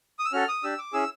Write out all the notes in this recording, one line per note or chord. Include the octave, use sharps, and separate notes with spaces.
D#6
E6
C#4 F#4 A4 F6
D#6
D4 G4 E6
D6
C#4 E4 G#4 E6